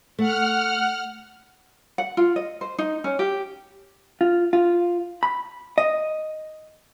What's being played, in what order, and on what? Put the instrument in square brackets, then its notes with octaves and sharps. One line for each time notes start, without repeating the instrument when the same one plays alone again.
[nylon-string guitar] A3 [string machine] F#5 F6
[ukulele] F#5
F4
D#5
C5
D#4
C#4
G4
[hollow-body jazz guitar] F4
F4
B5
D#5